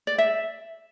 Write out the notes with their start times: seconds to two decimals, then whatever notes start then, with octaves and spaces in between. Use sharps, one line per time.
0.07 D5
0.18 E5